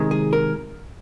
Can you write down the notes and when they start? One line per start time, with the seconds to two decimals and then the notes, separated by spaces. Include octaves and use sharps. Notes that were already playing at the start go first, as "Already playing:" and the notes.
Already playing: C3 D#3 G#3
0.11 G#4
0.33 A#4